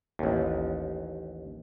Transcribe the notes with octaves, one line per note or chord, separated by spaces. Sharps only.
A1 D#2